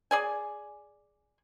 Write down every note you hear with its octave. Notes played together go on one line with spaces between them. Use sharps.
G#4 D5 G#5